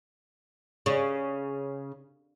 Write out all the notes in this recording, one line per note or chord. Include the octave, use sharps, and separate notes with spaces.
C#3